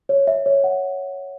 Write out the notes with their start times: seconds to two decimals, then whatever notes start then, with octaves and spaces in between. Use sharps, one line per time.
0.09 C#5
0.27 E5
0.46 C#5
0.64 F#5